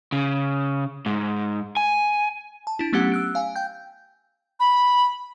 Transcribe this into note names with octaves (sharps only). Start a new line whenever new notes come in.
C#3
G#2
G#5
A5
D4 E4
F#3 A3 B3 C#4 G4 F#5
E6 F#6 D7
F5 G#5
G5 G6
B5